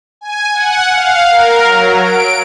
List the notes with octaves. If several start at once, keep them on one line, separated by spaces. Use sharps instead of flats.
G#5
F#5
F5
A#4
F#3
D7